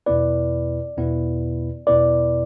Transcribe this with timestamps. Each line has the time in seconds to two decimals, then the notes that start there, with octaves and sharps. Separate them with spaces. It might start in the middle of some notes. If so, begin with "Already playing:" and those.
0.06 E2 B2 B3 E4 B4 D5
0.97 E2 B2 B3 E4 B4
1.87 E2 B2 B3 E4 B4 D5